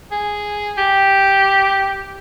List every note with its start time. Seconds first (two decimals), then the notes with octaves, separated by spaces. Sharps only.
0.11 G#4
0.78 G4